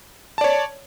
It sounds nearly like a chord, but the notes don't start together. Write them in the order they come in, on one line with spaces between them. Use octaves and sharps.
A5 D5 C#5